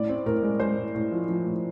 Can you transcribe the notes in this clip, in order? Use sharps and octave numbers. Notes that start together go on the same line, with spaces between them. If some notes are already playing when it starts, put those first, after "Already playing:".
Already playing: A2 D5
C4
A2 A#4
G#3
G#3 C5
A2
A2
F3
F3
A2